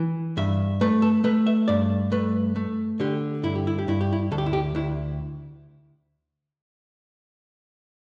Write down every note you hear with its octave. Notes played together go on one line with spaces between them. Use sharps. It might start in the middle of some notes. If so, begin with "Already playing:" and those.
Already playing: E3
G2 E5
A3 B4
A4
A3 B4
E5
G2 D5
A3 B4
A3
D3 G4
G2 E4
G4
E4
G4
G2 E4
G4
E4
D2 A4
G4
E4
G4
D2 E4